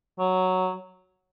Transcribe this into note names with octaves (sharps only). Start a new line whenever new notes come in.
F#3